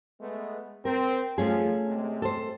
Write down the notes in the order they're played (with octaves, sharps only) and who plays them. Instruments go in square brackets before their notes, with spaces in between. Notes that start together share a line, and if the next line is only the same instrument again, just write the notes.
[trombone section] G#3 A3 B3
[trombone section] C4 [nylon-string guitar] A#4
[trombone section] F3 F4 [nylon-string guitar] A3 C#4 G#4
[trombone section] C3 G#3
[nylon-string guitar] A4 C5